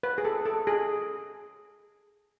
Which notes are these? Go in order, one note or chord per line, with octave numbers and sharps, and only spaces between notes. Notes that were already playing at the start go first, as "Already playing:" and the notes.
B4
G#4
A4
A4
G#4